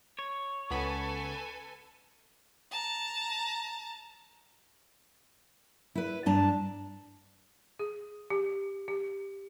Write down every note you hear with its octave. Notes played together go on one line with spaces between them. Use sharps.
C#5
C#2 B3 A4 B4 G#5 B5
A5 A#5
E4 B4
G2 D4 A5 A#5
G#4
G4
G4